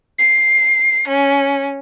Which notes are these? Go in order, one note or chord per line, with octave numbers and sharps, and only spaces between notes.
C7
C#4